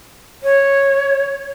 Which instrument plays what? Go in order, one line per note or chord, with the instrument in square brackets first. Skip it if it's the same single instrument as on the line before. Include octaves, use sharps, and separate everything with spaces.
[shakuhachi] C#5